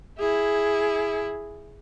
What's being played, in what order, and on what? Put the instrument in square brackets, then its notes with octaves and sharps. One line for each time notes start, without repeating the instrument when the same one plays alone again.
[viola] E4 G#4